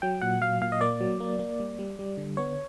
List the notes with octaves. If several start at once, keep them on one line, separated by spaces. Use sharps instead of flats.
F#3 G5
A#2 F#5
F#3 F5
A#2 F5
D#5
A#3 D5
F#3
A#3
A#3
G3
G3
G3
D3
B3 C#5